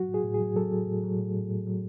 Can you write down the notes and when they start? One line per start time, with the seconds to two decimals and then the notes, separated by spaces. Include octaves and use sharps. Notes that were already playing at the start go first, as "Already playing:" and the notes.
Already playing: F#3 F#4
0.08 A2
0.14 G#4
0.24 A2
0.34 G#4
0.40 F#3
0.56 F#3 A4
0.72 F#3
0.87 A2
1.03 F#3
1.19 A2
1.36 A2
1.50 A2
1.67 F#3